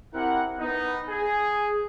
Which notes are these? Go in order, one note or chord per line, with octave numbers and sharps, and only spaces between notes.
C4 E4 G4 A#4 F#5
B3 D#4
G#4